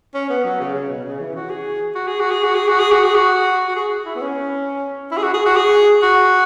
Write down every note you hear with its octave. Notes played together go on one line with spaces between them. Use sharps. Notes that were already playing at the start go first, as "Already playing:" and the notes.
C#4
B3
F#3
C#3
C#3
B2
C#3
E3
F#4
G#4
F#4
G#4
F#4
G#4
F#4
G#4
F#4
G#4
F#4
G#4
F#4
F#4
G#4
E4
B3
C#4
E4
G#4
F#4
G#4
F#4
G#4
F#4